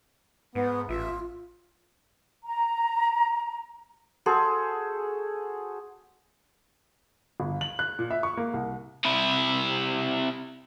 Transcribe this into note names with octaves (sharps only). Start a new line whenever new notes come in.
G#2 B3 B4
A1 F4 E5
A#5
F#4 G#4 A4 C5
G1
F#7
F#6
A#2
E5
C#6
A#3
C2
C3 E4